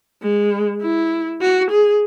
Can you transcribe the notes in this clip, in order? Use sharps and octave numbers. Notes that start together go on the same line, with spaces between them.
G#3
E4
F#4
G#4